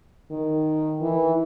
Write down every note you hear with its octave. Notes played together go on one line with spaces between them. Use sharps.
D#3
E3